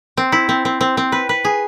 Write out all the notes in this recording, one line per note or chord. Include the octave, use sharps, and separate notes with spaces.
C4
E4
C4
C4
C4
C4
B4
B4
G#4